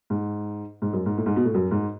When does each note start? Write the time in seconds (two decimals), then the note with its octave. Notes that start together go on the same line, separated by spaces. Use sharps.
0.10 G#2
0.82 G#2
0.93 F#2
1.06 G#2
1.18 A2
1.26 G#2
1.36 B2
1.45 A2
1.54 F#2
1.71 G#2